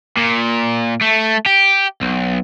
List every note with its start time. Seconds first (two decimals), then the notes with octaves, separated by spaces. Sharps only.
0.17 A#2
1.02 A3
1.46 G4
2.01 B1